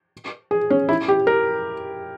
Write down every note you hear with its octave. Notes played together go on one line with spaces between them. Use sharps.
G#4
C#4
E4
G4
A#4